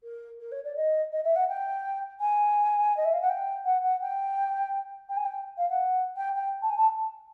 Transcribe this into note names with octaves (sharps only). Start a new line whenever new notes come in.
A#4
A#4
C#5
D5
D#5
D#5
E5
F#5
G5
G#5
D#5
E5
F5
F#5
G5
F#5
F#5
G5
G5
G#5
G5
F5
F#5
G5
G5
A5
G#5
A5